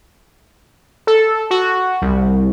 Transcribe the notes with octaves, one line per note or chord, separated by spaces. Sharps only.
A4
F#4
C2